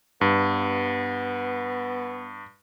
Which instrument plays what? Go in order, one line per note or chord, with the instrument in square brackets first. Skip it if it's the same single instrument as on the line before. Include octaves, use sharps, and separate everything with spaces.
[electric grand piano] G2 [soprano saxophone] B3